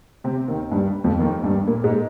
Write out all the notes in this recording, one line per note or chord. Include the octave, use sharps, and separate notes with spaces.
C3 C4
D#2 D#3
G2 G3
F2 F3
D#2 D#3
G2 G3
A#2 A#3
G#2 G#3